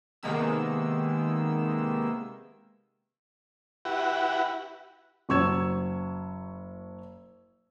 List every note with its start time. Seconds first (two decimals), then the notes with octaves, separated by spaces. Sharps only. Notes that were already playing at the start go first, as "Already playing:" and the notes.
0.23 C3 D#3 G#3 A#3 B3 E6
3.85 E4 F#4 G4 B4 F#5
5.29 F#1 F#3 C#6 E6 G#6 E7